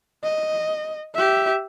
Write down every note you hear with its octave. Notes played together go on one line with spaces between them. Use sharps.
D#5
G4 E5